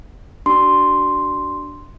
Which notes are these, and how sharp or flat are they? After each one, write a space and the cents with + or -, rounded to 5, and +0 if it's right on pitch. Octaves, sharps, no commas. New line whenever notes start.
D4 +0 F#4 +35 C6 +0